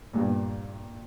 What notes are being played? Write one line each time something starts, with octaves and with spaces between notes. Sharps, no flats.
G2 A#2